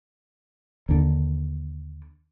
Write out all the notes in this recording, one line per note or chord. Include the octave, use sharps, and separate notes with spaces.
D#2 D3